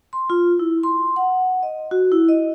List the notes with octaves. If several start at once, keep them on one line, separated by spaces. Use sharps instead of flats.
C6
F4
E4
C6
F#5
D#5
F#4
E4
D#5